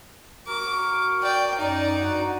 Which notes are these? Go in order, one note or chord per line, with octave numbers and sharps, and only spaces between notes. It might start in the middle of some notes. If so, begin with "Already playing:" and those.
F#4 A#4 C#6 D6
D5 G5
F#2 D#4 D5
G2 F#4 F#5